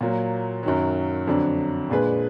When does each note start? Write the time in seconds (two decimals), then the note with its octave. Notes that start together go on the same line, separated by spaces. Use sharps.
0.01 A#2 F#3 A#3
0.63 F#2 D#3 F#3
1.27 F2 D3 F#3 D4
1.90 A#2 G#3 D4 G#4 B4